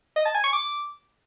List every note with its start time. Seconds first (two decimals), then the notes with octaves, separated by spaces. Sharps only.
0.16 D#5
0.25 A5
0.35 G#5
0.44 C#6
0.53 D6